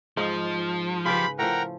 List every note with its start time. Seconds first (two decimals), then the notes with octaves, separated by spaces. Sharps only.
0.17 G#2 F3 F4 D#5
1.05 C#3 F4 G4 B4 F5 B5
1.39 A2 F3 A#4 F#5 G5 A#5